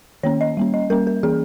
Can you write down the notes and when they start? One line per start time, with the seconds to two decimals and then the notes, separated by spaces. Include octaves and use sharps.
0.23 D#3 A#3 C#4 C#5
0.41 D#5
0.57 G3 A#3 C#4
0.74 D#5
0.90 G3 A#3 C#4 A#4
1.07 A#4
1.23 E3 A#3 C#4 G#4